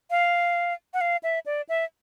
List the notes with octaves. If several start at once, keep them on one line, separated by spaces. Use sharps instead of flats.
F5
F#5
F5
E5
D5
E5